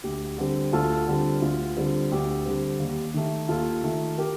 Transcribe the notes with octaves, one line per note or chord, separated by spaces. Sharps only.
D2 G4
D3 G3 C4
D2 F4 A4
D3 G3 C4
D2 F4
D3 G3 C4
D2 G4
D3 G3 C4
D#2
D#3 A3
D#2 F4 A4
D#3 A3
G4 A#4